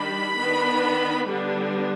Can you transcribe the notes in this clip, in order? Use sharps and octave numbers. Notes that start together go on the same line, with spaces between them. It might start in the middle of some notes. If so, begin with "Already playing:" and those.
Already playing: D#3 G3 D4 B5
D#3 B3 D4
D3 G3 B3 D4